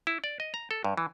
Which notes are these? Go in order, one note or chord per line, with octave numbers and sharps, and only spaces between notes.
E4
D5
D#5
A#5
A4
G2
E3